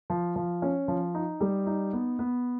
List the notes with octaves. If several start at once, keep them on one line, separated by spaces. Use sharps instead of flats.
F3
F3
C#4
F3
D#4
G3
D#4
B3
B3